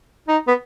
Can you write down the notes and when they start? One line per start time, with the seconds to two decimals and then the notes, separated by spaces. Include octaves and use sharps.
0.28 D#4
0.48 B3